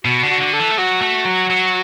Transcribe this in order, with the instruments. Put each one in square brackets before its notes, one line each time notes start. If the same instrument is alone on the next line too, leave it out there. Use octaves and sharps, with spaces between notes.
[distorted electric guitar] B2 [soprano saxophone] F#4
[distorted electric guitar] D3
[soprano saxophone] F#4
[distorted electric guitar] D3
[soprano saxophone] A4
[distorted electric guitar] E3
A3
[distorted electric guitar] F#3 [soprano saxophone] F#4
[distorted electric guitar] A3
F#3
F#3